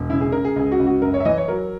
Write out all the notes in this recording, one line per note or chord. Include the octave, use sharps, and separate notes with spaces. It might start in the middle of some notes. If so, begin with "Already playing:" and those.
Already playing: E1
C#3 E4
G#4
C#3 A#4
G#4
C#2 G#4
F#4
C#2
F#4
F#2 A#4
C#5
E5
E3 D#5
C#5
F#3 A#4